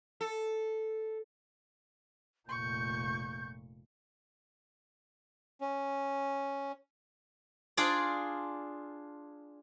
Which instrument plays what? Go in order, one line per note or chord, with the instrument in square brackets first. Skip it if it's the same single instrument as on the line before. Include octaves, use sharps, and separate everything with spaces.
[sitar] A4
[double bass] F1 A#2 [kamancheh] C#6 [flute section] G6
[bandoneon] C#4
[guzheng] D4 F4 G#4 D5